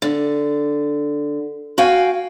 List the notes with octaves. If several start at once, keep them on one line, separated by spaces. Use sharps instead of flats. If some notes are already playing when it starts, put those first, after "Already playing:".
D3
F#4 F5 G5 G#5